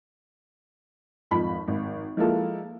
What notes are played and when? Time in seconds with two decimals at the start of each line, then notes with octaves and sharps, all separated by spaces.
1.31 G#1 F2 F4 B5
1.68 G#1
2.17 F3 G#3 A#3 E4 F4 A4